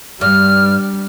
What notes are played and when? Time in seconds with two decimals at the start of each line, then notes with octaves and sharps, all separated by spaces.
0.21 G2 G3 F6